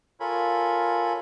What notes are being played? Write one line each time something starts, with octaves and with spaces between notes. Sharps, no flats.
F4 A4 A#4 C#5 G#5 B5